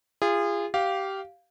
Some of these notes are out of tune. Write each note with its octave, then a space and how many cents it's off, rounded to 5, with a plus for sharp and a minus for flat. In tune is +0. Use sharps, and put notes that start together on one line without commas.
F4 -25 G#4 -30
G4 -15 F5 +0